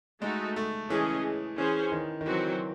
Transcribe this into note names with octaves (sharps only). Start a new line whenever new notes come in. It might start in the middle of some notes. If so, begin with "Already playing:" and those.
G#3 A3 D#4 F#4 A4
A3
E3 C#4 G#4 D#5
E3 C#4 G#4 C5
D#3
D#3
E3 F#3 C4 F#4